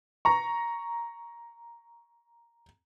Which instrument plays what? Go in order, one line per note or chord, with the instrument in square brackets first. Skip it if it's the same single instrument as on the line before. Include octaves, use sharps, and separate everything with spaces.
[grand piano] A#5 C#6